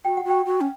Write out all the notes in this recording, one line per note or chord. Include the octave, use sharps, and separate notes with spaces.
F#4 G5
F#5
F#4
G5
F#4
C#4